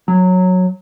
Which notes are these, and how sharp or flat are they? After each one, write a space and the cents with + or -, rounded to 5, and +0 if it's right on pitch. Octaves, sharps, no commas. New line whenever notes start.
F#3 -10